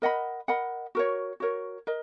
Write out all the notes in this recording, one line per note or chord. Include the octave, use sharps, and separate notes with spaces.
A#4 D#5 F#5 B5
A#4 D#5 F#5 B5
F#4 A#4 C#5
F#4 A#4 C#5
A#4 D#5